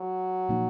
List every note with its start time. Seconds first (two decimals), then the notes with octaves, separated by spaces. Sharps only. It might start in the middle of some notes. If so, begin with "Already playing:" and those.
Already playing: F#3
0.49 A#2 F3 A#3 D#4